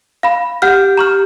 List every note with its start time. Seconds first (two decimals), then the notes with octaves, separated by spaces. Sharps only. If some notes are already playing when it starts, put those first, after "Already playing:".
0.23 F5 B5
0.62 G4 F#5 F6
0.97 A#5 C#6 F6